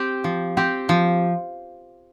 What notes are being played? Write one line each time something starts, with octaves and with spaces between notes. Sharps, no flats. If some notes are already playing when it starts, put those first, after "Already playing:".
Already playing: C4 G4
F3
C4 G4
F3